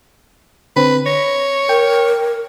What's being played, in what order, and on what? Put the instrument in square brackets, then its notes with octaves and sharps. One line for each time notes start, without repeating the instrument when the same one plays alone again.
[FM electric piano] D3 C4 [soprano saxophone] B4
[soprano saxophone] C#5 [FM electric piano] A#6
[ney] A#4 [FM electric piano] G5